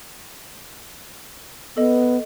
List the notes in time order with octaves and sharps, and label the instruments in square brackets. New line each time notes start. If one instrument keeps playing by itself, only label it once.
[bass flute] B3 [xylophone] A4 D#5